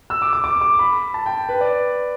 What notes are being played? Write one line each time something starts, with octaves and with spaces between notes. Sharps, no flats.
E6
D6
D6
D6
D6
B5
A5
G5
B4
D5